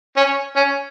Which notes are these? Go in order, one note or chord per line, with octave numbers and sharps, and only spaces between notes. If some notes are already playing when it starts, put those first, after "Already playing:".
C#4
C#4